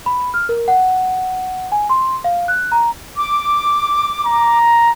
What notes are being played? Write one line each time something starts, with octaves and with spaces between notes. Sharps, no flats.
B5
F6
A#4
F#5
G#5
C6
F5
F#6
A#5
D6
A#5